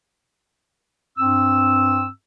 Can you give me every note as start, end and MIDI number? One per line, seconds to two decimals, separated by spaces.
1.18 2.08 43
1.18 2.08 60
1.18 2.08 88